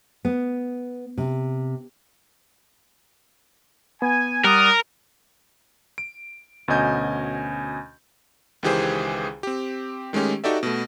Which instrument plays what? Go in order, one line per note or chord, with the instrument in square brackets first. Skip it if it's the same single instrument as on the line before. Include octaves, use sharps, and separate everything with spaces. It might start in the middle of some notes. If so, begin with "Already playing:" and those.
[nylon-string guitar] B3
C3
[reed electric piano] B3 [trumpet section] G#5
[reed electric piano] G3 [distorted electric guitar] A#4 [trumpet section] D5 F#5 D#6
[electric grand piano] D7
D2 B2 C#4 D#5 G#5 G6
C#2 D#3 E3 G4 G#4 C5
C4 G4
D#3 G#3 A3 C#4 G4
D#4 F#4 G4 A4 D5 E5
B2 A3